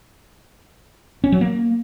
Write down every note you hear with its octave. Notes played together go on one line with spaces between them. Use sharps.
C#4
F#3
A#3